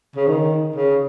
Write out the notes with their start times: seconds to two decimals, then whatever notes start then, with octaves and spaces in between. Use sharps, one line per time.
0.16 C#3
0.27 D#3
0.75 C#3